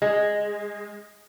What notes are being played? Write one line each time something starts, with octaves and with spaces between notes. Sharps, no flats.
G#3